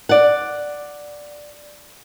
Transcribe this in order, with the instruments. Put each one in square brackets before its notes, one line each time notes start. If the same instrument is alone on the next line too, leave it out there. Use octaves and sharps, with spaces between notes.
[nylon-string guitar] D5 F#5